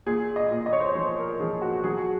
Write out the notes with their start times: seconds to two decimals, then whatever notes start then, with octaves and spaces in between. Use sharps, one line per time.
0.06 A#2 G#4
0.36 D#5
0.51 A#2
0.66 D#5
0.73 C#5
0.80 C5
0.87 C#5
0.95 F3 C5
1.18 A#4
1.40 F3 G#4
1.62 F#4
1.84 F#3 G#4
1.98 F#4